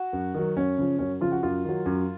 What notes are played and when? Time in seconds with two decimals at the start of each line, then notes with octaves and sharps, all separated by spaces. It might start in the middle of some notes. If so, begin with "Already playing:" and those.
Already playing: F#4
0.13 F#2
0.34 D#3 F#3
0.56 F#2 C#4
0.78 C#3 F3
0.99 F#2 C#4
1.21 C#3 F3 F4
1.32 F#4
1.43 F#2 F4
1.65 D#3 F#3
1.86 F#2